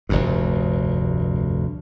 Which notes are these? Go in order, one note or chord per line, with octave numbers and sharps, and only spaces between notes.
F1 D2 G2